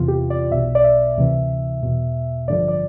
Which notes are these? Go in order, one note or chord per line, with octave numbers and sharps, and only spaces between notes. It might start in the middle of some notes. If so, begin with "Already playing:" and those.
Already playing: E2 C3 E3 F4
G4
D5
B1 B2 E5
D5
E5
D2 C3 E3
E2 B2
A1 G2 D3 F3 D5
D5